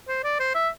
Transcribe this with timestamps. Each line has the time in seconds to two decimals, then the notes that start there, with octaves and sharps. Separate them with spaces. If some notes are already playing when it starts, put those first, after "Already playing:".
0.08 C5
0.24 D5
0.40 C5
0.55 E5